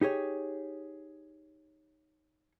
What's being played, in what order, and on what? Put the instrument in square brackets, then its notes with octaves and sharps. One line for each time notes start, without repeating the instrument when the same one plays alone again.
[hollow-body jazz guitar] D#4 G4 G#4 C#5